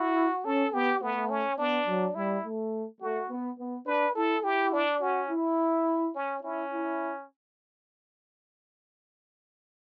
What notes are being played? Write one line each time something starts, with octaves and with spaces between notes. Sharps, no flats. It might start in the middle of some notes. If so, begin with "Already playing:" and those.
Already playing: E4 F#4
C#4 A4
B3 G4
A3 B3
C#4
B3 D4
F#3
G3 E4
A3
A3 F#4
B3
B3
D4 B4
E4 A4
E4 G4
D4
C#4 F#4
E4
C#4
C#4 E4
E4